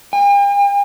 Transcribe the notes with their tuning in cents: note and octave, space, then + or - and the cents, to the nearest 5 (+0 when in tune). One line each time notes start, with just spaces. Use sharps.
G5 +45